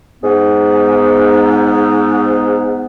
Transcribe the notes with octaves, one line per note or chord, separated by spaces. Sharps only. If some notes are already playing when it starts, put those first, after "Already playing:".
G#2 B3